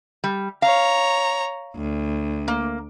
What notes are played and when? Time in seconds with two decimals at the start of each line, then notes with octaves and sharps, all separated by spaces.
0.24 G3
0.62 C#5 F5 A#5
1.76 D2
2.48 A#3